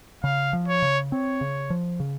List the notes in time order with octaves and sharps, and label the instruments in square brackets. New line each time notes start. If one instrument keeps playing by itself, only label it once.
[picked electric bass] C#3 [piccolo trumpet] F5
[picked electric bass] F3
[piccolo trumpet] C#5
[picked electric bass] C#3
[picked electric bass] C4 [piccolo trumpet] C#5
[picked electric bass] C#3
F3
C#3